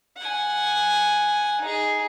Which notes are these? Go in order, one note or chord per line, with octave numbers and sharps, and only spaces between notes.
F#5 G#5
D#4 G#4